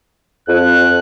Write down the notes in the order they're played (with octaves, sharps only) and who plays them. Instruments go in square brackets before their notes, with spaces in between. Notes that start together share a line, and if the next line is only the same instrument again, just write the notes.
[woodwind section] F2 [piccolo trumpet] F#6